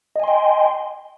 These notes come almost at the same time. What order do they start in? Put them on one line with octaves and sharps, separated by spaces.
D#5 G#5 C6 G5